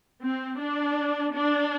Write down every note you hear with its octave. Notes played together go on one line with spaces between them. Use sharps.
C4
D4
D4